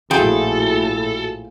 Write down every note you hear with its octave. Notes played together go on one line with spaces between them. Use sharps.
A#1 A2 F3 E4 F#4 G#4 A4 G5